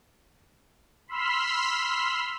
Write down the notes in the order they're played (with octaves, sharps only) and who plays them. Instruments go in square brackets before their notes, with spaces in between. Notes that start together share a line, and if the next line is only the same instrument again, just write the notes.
[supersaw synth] B5 C6 E6 F6 B6